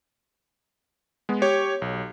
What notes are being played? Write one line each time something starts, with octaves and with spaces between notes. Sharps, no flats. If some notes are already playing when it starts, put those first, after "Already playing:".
G#3 B3
G4 C#5
B1